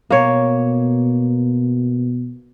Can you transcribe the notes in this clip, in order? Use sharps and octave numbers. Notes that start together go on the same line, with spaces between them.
B2 A#3 C#5